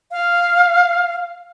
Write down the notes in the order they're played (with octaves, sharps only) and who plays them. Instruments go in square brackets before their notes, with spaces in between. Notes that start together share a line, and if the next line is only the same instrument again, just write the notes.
[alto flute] F5